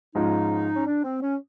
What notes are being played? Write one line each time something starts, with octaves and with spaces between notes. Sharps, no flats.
G#2 F3 G#3 C#4 D#4 F4
C#4
D4
C4
C#4